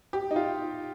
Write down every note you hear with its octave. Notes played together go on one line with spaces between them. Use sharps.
G4
D#4
F4